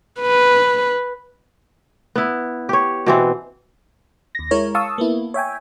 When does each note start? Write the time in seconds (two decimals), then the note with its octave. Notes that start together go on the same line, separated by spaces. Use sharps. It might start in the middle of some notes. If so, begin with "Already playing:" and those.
0.21 B4
2.16 B3 E4
2.69 G4 C#5
3.06 B2 E3 C4
4.35 D#2 A#6
4.51 G#3 E4 A#4 C#5
4.75 F5 A5 C#6 D#6 E6
4.98 A#3 B3 E4
5.34 C#5 E5 G5 G#5